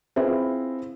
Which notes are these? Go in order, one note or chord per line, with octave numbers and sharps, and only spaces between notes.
C4 E4 F4 G#4 B4 C5